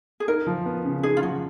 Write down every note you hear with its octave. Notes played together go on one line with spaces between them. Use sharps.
G#4
D#4 A#4
F3
B3
C#3
D#4 G#4
F4
F3 F#4